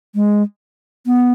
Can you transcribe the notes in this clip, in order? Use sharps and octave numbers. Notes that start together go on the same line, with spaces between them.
G#3
B3